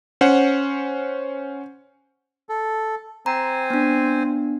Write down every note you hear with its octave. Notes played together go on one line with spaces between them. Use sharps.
C#4 C5 F#5
A4
C4 C5 G#5 A#5
B3 D4